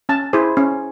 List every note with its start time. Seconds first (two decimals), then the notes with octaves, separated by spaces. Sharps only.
0.09 C#4 A5
0.33 E4 G#4 C5
0.57 C#4